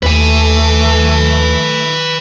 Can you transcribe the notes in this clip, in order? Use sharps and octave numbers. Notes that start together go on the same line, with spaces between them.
D#2 A3 B4 G#5